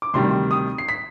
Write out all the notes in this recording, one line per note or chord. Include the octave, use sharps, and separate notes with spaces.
D6
D2 C3 D#3 G3 C6
D#6
C7
B6